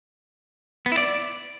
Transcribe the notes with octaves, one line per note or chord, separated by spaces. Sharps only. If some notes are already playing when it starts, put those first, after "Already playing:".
B3
E4
D5